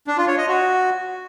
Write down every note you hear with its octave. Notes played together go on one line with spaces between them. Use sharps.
D4
F4
C#5
D#5
F#4